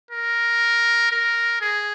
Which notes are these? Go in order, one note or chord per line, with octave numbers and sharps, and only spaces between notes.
A#4
A#4
G#4